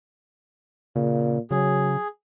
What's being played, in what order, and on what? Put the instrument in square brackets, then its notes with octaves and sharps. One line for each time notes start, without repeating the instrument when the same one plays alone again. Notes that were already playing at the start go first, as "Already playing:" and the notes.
[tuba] A#2 [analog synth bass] C#3
[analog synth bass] C#3 [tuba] F#3 [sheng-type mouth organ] G#4